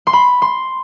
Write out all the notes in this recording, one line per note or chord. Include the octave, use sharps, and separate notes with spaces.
C6
B5
C6